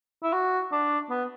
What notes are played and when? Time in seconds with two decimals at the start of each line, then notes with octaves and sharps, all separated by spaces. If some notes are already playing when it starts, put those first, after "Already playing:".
0.23 E4
0.33 F#4
0.72 D4
1.10 B3